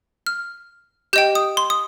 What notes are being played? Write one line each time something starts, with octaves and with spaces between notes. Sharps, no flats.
F6
G4 D#5 G5 G6
D#6
C6
D#6